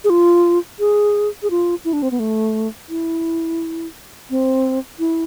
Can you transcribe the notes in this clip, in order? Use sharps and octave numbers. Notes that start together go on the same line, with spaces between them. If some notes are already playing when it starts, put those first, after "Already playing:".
G#4
F4
G#4
G#4
F4
E4
D4
C4
B3
A3
E4
C4
E4